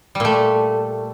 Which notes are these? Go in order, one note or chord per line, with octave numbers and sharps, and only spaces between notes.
A#2 G3 A3